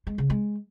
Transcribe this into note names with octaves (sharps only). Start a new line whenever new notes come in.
G#3
C#3
G#3